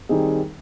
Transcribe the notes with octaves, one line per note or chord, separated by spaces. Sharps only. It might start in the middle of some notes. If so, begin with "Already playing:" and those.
D#3 G3 C4 D#4 G#4